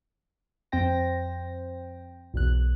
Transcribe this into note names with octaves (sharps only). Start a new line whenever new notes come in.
F2 C4 C5 G5 A#6
B1 E2 F#6